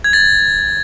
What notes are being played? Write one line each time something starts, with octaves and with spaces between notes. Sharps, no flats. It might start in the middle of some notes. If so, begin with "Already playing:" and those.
G#6
A6